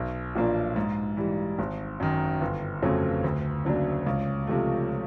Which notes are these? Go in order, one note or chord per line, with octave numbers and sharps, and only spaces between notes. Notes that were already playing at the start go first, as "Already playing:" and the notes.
Already playing: B1
A#2 F3 A#3 D4
G#2
E3 G3
G#1
F#2 D#3
G1
F2 C#3 F#3 A3
D2
C#3 F#3 A#3 D4
C#2
C3 F3 A3